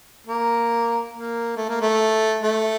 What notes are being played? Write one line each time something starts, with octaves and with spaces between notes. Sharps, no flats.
A#3
A#3
A3
A#3
A3
A3